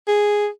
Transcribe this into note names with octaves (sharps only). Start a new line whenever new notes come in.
G#4